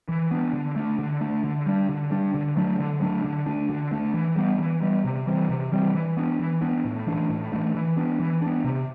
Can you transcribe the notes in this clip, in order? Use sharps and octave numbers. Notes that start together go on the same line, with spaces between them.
E3
B3 D4
D3
A3 D4
D3
A3 D4
D3
G3 D4
D3
G3 D4
D3
F#3 A3 D4
D3
F#3 A3 D4
D3
A3 D4
D3
A3 D4
E3
G3 B3
E3
G3 B3
C3
E3 G3 C4
C3
E3 G3 C4
E3
B3 D4
E3
B3 D4
A2
E3 A3 D4
A2
E3 A3 D4
E3
B3 D4
E3
B3 D4
C3